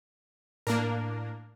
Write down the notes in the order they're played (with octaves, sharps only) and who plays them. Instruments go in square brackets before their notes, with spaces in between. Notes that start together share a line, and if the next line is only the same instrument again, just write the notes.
[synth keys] A2 [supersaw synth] A#3 D4 A#4